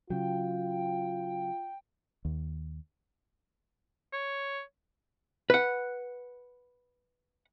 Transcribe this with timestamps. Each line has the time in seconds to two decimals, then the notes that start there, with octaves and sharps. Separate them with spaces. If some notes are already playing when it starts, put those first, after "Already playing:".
0.10 C#3 F#3 F4 G5
2.25 D#2
4.13 C#5
5.50 B4 F#5